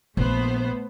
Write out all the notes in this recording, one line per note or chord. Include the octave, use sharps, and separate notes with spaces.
A#1 A3 B3 C5